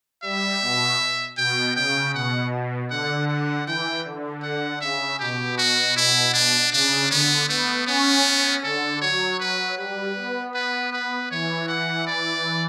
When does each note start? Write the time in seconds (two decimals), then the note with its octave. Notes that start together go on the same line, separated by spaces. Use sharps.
0.22 G3 E5
0.62 B2
1.37 B2 G5
1.76 C#3 G5
2.14 B2 F#5
2.90 D3 F#5
3.28 F#5
3.66 E3 G5
4.05 D3
4.43 F#5
4.81 C#3 E5
5.19 B2 G4
5.57 F#4
5.96 E4
6.33 D4
6.72 C#3 D4
7.10 D3 B3
7.49 A3 B3
7.86 B3 C#4
8.24 C#4
8.63 D3 A4
9.01 F#3 C#5
9.39 F#3 B4
9.77 G3 B4
10.15 B3
10.54 B4
10.92 B4
11.31 E3 C#5
11.68 F#5
12.07 D5